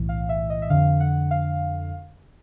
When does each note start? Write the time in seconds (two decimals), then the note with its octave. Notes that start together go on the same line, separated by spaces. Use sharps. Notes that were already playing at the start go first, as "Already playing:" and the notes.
Already playing: B1 A2 E3
0.09 F5
0.29 E5
0.50 D#5
0.62 E5
0.70 F2 D3 F5
1.00 F#5
1.31 F5